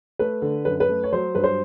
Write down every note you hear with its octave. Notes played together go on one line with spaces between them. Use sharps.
A3 B4
D3
F#2 B4
B4
A3
C#5
F#3 C5
G2 B4
C5